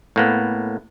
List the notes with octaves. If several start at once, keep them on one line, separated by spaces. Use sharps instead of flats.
A2 A#3 B3